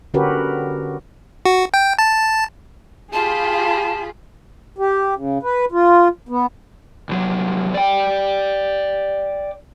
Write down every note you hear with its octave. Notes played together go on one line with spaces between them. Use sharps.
D3 C#4 F#4 G4 A#4 B4
F#4
G5
A5
F4 G4 G#4 A5 B5
G4
C#3
B4
F4
B3
C2 F#3
D5 G5